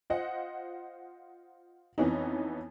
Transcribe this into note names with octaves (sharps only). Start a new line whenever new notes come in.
F4 C5 D#5 F#5
F2 E3 B3 C#4 D#4